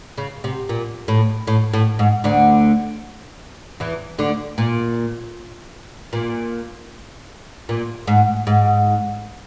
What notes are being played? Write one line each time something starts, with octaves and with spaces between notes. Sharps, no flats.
C#3
C3
A#2
A2
A2
A2
G#2
D2 D3
E2 E3
D2 D3
A#2
A#2
A#2
G#2
G#2